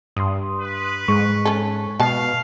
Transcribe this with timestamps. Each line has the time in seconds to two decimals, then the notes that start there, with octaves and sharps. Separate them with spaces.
0.16 G2 C6 D#6
0.59 B4
1.08 G#2 G#3 C#6
1.45 C#4 A4
2.00 B2 B3 F5 A5